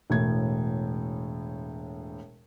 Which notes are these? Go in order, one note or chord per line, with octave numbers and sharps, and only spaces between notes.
E1 A2 G#6